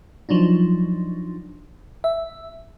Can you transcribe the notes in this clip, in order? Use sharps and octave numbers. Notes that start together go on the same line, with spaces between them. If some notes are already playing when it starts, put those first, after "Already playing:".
F3 F#3 D4 D#4
E5